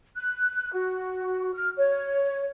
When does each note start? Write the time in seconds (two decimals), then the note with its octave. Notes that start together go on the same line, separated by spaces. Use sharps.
0.16 F#6
0.73 F#4
1.54 F6
1.77 C#5